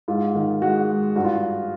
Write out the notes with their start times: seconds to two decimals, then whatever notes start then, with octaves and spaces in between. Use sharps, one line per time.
0.08 G#2 F4
0.35 D#3
0.62 G#3 F#4
0.89 G#2
1.16 G2 F#4
1.24 F4